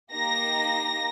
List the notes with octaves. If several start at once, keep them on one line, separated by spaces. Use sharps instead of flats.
A#3 D#4 G4 A#6